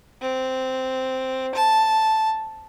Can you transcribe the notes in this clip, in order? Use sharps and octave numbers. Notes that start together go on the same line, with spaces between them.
C4
A5